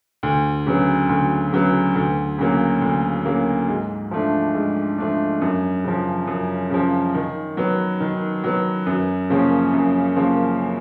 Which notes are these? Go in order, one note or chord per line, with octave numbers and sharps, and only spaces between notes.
D2
C#3 F#3 B3
D2
C#3 F#3 B3
D2
C#3 F#3 A#3
D2
C#3 F#3 A#3
G#2
F3 A3 D4
G#2
F3 A3 D4
F#2
C#3 F3
F#2
C#3 F3
D#3
F#3 B3
D#3
F#3 B3
F#2
C#3 F3 A#3 C#4
F#2
C#3 F3 A#3 C#4